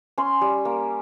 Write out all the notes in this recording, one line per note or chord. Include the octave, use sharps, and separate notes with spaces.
C#4 C6
G3
A#3